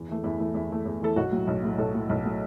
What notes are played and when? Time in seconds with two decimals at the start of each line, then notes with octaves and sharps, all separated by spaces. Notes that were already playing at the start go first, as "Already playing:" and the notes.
Already playing: E2
0.08 E3 A3
0.24 E2 E4
0.39 E3 A3 E4
0.54 E2 E4
0.70 E3 A3
0.85 E2
1.01 E3 A3 A4
1.16 B1 F#4
1.32 A2 F#3
1.47 B1
1.63 A2 F#3
1.78 B1 A4
1.94 A2 F#3
2.09 B1
2.25 A2 F#3